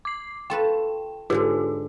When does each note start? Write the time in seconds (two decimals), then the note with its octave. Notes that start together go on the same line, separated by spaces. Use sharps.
0.05 D6 C7
0.50 F4 A4 B4 G5
1.30 G#2 D3 G#3 F4 G4